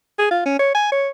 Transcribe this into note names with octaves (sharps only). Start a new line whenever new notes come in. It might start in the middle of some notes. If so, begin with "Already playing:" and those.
G#4
F4
C#4
C#5
G#5
C#5